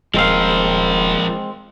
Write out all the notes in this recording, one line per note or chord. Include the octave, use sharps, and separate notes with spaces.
D#1 F3 G#3 C4 A#4 F5